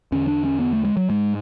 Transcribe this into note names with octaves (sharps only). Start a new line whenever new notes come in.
E2 D3 C#4
D4
C#4
B3
A3
G#3
F#3
G#2 G#3